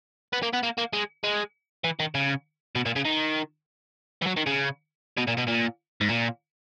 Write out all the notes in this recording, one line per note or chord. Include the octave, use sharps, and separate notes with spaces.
B3
A#3
B3
A#3
A#3
G#3
G#3
E3
D#3
C#3
B2
A#2
C#3
D#3
E3
F#3
D#3
C#3
B2
A#2
B2
A#2
G#2
A#2